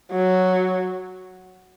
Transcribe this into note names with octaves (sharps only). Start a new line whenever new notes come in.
F#3